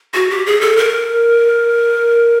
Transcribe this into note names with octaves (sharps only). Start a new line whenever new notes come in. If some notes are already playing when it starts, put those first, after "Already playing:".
F#4
G4
G#4
A4
A#4